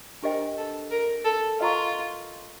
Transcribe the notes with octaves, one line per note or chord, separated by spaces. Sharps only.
D4 G4 A#4 C5 D#5 G5
A4
A#4
A4
F4 B4 D#5 F#5 A#5 C#6